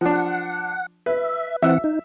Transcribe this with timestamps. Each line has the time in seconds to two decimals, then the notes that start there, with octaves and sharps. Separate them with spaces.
0.01 F3 D4 F#5
1.06 B4 E5
1.62 E3 C4 E5 F#5 E6
1.84 D#4